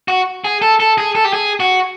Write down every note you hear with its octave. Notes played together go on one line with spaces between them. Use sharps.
F#4
G#4
A4
A4
G#4
A4
G4
G#4
F#4